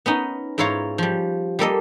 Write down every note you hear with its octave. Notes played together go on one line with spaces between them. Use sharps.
B3 C#4 D#4
G#2 E4 F4 C#5 F5 A#5
F3 G3
G3 A#3 A4 D#5